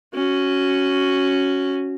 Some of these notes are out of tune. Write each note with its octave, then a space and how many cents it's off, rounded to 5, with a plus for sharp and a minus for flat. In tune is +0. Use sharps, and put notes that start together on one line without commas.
C#4 +0 F#4 +0